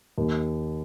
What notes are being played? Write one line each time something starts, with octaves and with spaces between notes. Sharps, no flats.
D#2